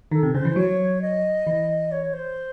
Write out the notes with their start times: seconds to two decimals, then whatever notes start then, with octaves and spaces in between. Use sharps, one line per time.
0.11 D#3 A4
0.23 C3
0.34 C#3 C5
0.45 E3
0.56 F#3 C#5
1.01 D#5
1.47 E3
1.92 C#5
2.13 C5